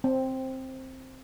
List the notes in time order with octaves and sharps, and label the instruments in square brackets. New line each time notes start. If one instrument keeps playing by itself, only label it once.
[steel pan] C4